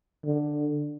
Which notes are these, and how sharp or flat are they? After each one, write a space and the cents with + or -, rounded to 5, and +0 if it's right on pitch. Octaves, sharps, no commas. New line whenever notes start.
D3 +10